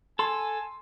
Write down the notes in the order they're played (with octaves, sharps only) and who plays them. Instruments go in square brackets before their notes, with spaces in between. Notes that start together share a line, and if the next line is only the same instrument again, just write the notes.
[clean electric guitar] A4 [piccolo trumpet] G#5 [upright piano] C6